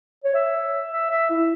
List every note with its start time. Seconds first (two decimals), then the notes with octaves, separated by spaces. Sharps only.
0.24 C#5
0.35 E5
0.92 E5
1.10 E5
1.30 E4